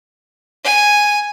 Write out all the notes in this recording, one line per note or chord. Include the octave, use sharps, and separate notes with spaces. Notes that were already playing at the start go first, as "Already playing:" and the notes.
G#5